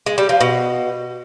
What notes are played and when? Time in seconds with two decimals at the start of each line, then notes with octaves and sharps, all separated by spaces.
0.06 G#3
0.18 G3
0.29 F3
0.41 B2